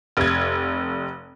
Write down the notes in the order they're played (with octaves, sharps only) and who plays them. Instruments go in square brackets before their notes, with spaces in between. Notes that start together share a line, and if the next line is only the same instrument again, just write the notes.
[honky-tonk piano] F1 G#6